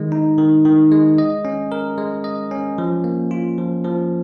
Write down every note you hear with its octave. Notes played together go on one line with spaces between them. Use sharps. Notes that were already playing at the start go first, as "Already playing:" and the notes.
Already playing: D#3 G#3
D#4
D#3
D#3
G#3
D#5
C#4
A#4
G#3
D#5
C#4
F3
A#3
F4
F3
F3